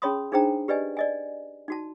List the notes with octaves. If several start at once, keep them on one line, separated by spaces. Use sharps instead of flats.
C#4 G#4 C#5 B5 C6 D#6
D4 D#4 G#4 C5 G5 A#5
G4 B4 D5 D#5 G#5
D5 D#5 G#5
D#4 F#4 A5